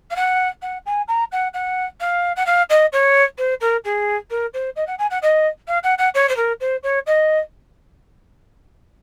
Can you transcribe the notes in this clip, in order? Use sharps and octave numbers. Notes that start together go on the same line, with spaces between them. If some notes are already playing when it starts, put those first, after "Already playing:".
F5
F#5
F#5
G#5
A#5
F#5
F#5
F5
F#5
F5
D#5
C#5
C5
A#4
G#4
A#4
C5
D#5
F#5
G#5
F#5
D#5
F5
F#5
F#5
C#5
C5
A#4
C5
C#5
D#5